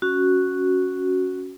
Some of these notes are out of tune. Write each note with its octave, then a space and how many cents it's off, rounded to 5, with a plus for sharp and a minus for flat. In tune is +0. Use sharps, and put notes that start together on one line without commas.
C#4 +0 F#4 +0